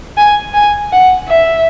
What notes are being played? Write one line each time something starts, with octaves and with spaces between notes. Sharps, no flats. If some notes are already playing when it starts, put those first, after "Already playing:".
G#5
G#5
F#5
E5